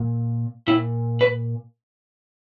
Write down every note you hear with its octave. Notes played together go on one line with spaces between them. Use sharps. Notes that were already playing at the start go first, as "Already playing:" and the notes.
Already playing: A#2
A#2 E4
B4